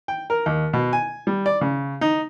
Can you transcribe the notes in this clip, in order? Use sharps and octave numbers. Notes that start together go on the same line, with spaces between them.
G5
A#4
D#2
B2
G#5
G3
D5
C#3
D#4